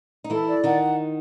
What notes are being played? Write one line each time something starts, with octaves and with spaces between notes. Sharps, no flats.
D#4
E3 E4 A4
D5
D#3 D#4 F#5